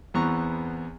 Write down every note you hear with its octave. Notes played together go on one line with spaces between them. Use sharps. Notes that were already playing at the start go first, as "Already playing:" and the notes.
E2 E3 B3 C4 A#5 C#6